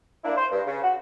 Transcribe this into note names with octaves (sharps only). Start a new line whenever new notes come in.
A#3 D4 E4
C5
G2
C#3
F#4